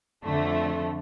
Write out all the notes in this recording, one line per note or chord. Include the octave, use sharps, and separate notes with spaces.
F2 D3 A3